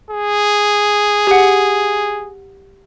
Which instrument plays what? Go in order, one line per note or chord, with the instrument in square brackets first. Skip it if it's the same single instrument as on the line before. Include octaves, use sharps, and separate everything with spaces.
[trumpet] G#4
[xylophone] G4 F#5